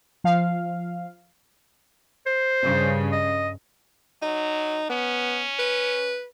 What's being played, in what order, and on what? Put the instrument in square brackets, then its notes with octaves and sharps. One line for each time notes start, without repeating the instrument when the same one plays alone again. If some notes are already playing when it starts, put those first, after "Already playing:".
[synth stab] F3 F5
[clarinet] C5
[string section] G2 C#3
[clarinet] D#5
[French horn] F#3 [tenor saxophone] D#4
[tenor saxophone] B3 [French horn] C#4
[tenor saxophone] B4